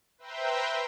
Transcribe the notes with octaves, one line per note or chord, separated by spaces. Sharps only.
B4 C5 E5 G5 A#5 C6